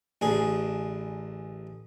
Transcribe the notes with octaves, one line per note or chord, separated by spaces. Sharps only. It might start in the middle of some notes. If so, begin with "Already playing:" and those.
A1 D3 G#4